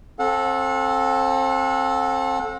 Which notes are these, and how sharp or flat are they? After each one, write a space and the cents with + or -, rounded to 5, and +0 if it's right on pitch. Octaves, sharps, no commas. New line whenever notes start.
C4 +30 A4 -10 F#5 -35